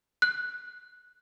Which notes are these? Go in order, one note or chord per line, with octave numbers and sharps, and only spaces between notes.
F#6